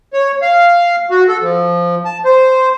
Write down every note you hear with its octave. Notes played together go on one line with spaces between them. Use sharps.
C#5
F5
F#4
A4
F3
A5
C5